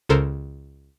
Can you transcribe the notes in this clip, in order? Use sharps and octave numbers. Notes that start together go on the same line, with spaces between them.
C#2 C#3 A4 A#4 C5